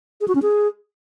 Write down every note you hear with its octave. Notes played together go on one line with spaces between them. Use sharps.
G#4
F#4
C#4
G#4